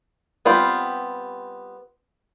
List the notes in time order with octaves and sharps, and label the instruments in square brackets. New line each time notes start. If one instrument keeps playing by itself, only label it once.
[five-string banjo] G3 B3 C4 F4 G4